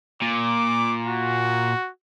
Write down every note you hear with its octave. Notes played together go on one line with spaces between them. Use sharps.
A#2 D6
F#4